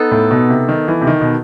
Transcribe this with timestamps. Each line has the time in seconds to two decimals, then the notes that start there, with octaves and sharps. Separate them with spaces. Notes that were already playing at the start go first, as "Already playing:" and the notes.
Already playing: B3 D#4 A4
0.11 A2
0.31 B2
0.49 C3
0.69 D#3
0.88 E3
1.01 C3
1.07 D#3
1.21 B2